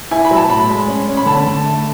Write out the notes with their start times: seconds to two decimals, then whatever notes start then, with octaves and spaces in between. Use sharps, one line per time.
0.11 E4 G#5
0.25 B5
0.31 F#3
0.36 A5
0.50 A2 B5
0.69 G#3
0.88 C#4
1.08 C#4
1.17 B5
1.26 D3 A5
1.46 D3
1.65 A3